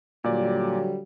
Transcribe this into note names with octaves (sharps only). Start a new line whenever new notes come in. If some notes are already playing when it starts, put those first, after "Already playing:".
A#2 D3 F#3 G3 D5